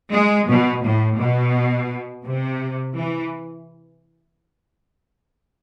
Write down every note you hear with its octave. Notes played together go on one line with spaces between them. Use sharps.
G#3
B2
A2
B2
C3
E3